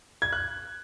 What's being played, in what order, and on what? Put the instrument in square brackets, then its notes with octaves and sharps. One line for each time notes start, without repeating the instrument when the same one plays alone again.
[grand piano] G#6
F#6